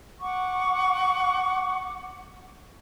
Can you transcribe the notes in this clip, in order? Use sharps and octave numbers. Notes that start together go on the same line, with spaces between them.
F#5 C#6 D6